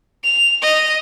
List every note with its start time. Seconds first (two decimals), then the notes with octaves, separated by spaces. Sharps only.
0.24 F7
0.62 D#5